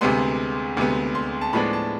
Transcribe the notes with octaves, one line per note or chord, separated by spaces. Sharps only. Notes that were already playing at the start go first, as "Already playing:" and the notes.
D2 C3 G#3 B3 C6
D2 C3 G#3 B3
C6
A5
A2 F3 G#3 B3 D4 B5
A5